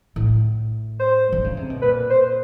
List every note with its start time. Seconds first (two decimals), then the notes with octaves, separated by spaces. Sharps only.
0.16 A2
0.99 C5
1.32 D3
1.44 C#3
1.57 C3
1.70 B2
1.82 A#2 B4
2.10 C5